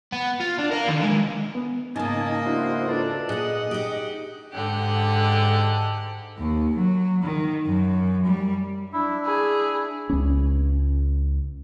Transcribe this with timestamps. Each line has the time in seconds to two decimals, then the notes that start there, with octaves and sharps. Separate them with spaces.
0.12 B3
0.40 F4
0.59 D4
0.72 A#4 F5
0.88 D3 D#3
1.03 D#2 G#3
1.55 B3
1.96 G#2 C#3 A#3 D#4 D#5 G#5 A5
2.46 D4 E4 F#4 C5
2.88 D4 F4 A4 B4
3.29 A#2 D#4 G#4 D#5 F#5
3.71 D#4 G4
4.52 G#2 D3 G4 F#5
6.38 D#2
6.76 F#3
7.23 D#3
7.65 F#2
8.26 G3
8.93 D4 E4
9.25 E4 G#4
10.10 C#2 C#4